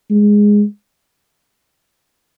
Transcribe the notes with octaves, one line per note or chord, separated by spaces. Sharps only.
G#3